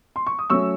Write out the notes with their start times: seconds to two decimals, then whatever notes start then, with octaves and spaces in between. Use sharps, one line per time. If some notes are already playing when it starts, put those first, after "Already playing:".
0.16 C6
0.27 C#6
0.39 D#6
0.50 F#3 A3 C#4 C#6 E6